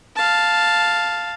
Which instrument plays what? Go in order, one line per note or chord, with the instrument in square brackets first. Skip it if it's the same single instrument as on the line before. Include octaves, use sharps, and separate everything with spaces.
[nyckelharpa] F5 A5